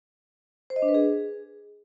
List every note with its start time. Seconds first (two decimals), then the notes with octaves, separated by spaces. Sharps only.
0.70 C5
0.76 D#5
0.82 D4
0.88 B4
0.94 G#4